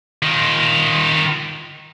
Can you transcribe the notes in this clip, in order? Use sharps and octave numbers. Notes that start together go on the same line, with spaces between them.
D#3 F4